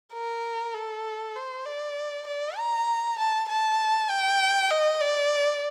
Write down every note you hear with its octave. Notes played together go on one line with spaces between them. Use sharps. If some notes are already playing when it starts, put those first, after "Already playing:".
A#4
A4
C5
D5
D5
A#5
A5
A5
G5
D#5
D5